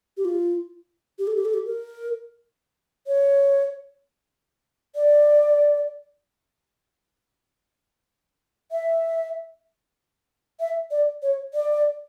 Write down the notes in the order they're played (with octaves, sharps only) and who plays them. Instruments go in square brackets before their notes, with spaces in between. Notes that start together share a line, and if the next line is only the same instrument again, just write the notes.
[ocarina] G4
F4
G4
A4
G4
A4
G4
A#4
C#5
D5
E5
E5
D5
C#5
D5